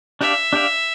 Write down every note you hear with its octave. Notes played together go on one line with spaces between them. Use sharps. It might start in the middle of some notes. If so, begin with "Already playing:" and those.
D4 G4 D5 E5 F5
D4 G4 D5 F5